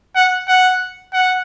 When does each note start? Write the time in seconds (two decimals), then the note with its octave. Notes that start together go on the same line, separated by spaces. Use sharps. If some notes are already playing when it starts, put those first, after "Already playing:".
0.16 F#5
0.48 F#5
1.14 F#5